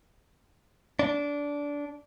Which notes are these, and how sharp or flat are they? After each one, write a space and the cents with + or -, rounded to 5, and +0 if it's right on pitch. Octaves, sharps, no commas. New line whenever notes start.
D4 -20